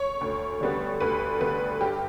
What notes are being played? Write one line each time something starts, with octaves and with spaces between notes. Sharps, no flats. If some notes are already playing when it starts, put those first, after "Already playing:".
Already playing: C#5
D2
D3 G3 B3
D2 B4
D3 G3 B3 B4
G2 G4